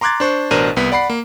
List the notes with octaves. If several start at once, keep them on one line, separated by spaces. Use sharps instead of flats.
A#5 C6 D6 F#6 G#6 A6
D4 C5 C#6
A1 B2 D4 A#4 C5 D#7
C2 B3 B6
D5 F#5 B5 C7
A#3